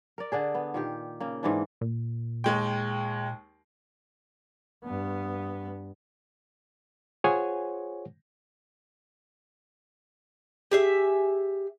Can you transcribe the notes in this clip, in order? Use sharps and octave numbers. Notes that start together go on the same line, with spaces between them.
A#4 D5
D3 D4 G#4
B3
A#2 D#3 G4
C#3 A#3
G#2 E3 D4
A#2
D#2 G#3 G5
G2 B3
F4 G#4 C5 C#5 F#5 G#5
G4 G#4 E5